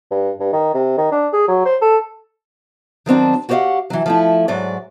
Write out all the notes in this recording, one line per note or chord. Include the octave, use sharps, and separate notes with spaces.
G2
G2
D#3
C3
D#3
D4
G#4
F#3
C5
A4
D#3 F#3 C4 D4
F#4 G4 C5 D#5 F5 F#5
E3 F#3
F3 A3 E4
G#2 F#3 D5